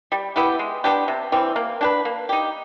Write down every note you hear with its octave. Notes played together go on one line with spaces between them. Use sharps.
G3
B3 E4 G4
G#3
B3 D4 G4
C3
E3 G3 C4
A#3
D4 G4 B4
A#3
D#4 G4